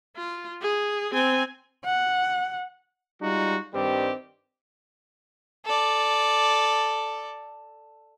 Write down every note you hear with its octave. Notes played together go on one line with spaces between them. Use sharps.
F4
G#4
C4 G#5
F#5
G3 G#3 D#4 F4 F#4
G2 D#3 G3 C4 G4
A4 D5